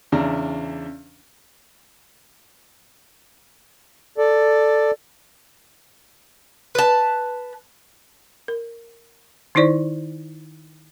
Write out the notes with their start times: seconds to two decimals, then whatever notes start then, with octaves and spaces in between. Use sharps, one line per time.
0.12 E2 C#3 D4 A#5
4.18 A4 D5
6.75 B4 A5
8.48 A#4
9.55 D#3 D#4 E4 C5 D5